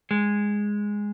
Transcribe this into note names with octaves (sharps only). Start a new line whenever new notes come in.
G#3